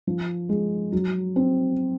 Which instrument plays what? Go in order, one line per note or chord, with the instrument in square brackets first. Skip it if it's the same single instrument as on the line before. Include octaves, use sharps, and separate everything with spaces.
[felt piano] F3
G#3
F#3
C4